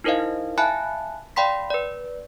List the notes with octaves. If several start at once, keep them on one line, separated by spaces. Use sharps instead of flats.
D#4 E4 A#4 C5 D#5 F5
E5 F5 G#5 A5 B5 F#6
D5 F5 G5 B5 C6 B6
B4 D5